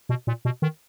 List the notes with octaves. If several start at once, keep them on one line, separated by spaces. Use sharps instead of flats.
B2
A#2
B2
D#3